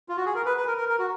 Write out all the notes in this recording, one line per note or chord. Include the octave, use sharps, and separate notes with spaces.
F4
F#4
G#4
A#4
B4
B4
A#4
A#4
A#4
F#4